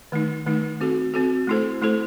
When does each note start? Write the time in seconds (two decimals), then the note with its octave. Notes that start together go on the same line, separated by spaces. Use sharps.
0.12 D#3 A3 D#4
0.46 D#3 A3 D#4
0.81 C4 F#4 A4
1.14 C4 F#4 A4
1.47 A3 E4 A4 C5
1.82 A3 E4 A4 C5